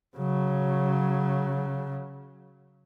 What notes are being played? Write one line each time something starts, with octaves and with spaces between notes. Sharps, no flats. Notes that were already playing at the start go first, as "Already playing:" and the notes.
C#3 F#3